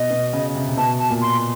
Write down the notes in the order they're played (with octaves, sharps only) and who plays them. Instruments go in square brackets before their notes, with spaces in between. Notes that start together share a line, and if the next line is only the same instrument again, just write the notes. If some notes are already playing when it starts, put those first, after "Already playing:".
Already playing: [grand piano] B2 [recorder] D#5
[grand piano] B2
C#3
C3
C3
[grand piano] B2 [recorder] A5
[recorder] A5
[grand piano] A#2
[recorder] C6